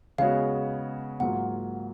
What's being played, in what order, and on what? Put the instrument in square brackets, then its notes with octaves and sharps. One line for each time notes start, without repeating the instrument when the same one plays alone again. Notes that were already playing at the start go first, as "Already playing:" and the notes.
[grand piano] C#3 G#3 B3 F#4 C#5 [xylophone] F5
[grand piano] G#2 F#3 A#3 F4 [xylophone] F#5